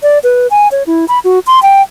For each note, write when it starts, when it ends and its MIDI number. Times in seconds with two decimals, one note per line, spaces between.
0.03 0.18 74
0.24 0.47 71
0.50 0.68 80
0.72 0.83 73
0.87 1.05 64
1.08 1.19 83
1.24 1.39 66
1.47 1.62 84
1.62 1.82 79